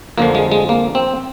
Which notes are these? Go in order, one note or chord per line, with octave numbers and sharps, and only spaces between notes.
F2 D3 F3 A#3
G#3
G#3
A#3
C4